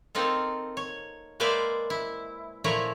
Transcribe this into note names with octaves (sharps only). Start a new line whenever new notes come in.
A#3 C4 D#4 F4 A4
C#5
G#3 A#3 B4 C5 D5 E5
E4
A#2 F3 A3 E4 C#5 A#5